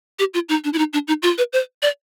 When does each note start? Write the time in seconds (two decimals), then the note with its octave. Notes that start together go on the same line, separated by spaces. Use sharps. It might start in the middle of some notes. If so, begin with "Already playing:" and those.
0.19 G4
0.34 F4
0.49 D#4
0.64 D4
0.73 E4
0.78 D#4
0.93 D4
1.08 D#4
1.23 F4
1.38 B4
1.53 C5
1.82 D5